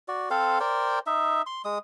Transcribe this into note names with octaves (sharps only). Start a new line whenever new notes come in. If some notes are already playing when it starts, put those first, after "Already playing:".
F#4 D5
C4 A4 C5 F5
A#4 C5 D5 G5
D#4 E5
C6
G#3 D#6